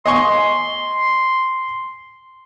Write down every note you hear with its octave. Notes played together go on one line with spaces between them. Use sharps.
D#5 G#5 C6 C#6